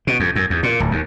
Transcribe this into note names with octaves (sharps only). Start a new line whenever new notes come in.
B2
F2
F#2
E2
A#2
D1
D#2